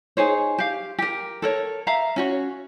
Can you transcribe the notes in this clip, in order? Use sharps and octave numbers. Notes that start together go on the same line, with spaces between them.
D#4 G#4 C5 C#5
G4 F5
G4 A#4
A4 A#4 C#5
E5 F5 A#5
C#4 F#4 C#5